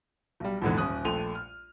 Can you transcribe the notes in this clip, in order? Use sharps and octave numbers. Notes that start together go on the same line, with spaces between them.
B1 G3
A#1 E2 G#2 D3 E3
D#1 C#4 D#6 F#6
A#1 A3 G5 C6 D#7 F7
F6